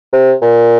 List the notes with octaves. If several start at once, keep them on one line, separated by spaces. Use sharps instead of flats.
C3
A#2